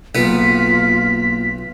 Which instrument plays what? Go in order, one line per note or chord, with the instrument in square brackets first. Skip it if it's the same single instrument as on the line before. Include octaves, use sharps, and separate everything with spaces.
[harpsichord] B1 B3 [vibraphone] A#3 [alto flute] F4 [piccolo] B6